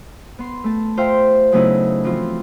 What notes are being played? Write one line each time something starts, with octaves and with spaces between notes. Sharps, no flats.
B3 C6
A3 A5
F4 C5 E5 F5 G5
C#3 F#3 A3 B3 D#4 E4
E3 F3 C4 E4 F4